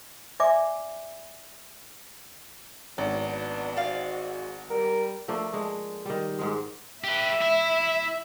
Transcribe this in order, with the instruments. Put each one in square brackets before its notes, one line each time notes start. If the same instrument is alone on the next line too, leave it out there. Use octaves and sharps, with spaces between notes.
[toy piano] D5 E5 G#5 D6
[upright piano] G#1 [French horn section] F#3 B3 D4
[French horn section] G#2 F#4 [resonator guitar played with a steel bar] D5 F5
[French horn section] G3 [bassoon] A#4
[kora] F3 A3 A#3 D4
G#3 D4
D#3 G3
G#2 G#3
[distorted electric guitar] G4 B4 [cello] E5
[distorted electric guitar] E4